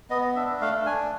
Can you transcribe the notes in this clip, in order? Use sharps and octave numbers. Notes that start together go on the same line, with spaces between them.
B3 D#5
D4 E5
A3 F5
D4 G#5